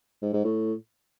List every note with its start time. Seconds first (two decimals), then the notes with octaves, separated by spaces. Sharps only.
0.22 G#2
0.33 G#2
0.44 A2